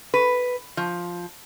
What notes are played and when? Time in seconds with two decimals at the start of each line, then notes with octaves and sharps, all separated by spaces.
0.14 B4
0.77 F3